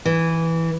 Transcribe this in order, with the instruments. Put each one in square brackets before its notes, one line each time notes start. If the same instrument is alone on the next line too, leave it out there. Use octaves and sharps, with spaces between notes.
[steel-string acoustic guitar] E3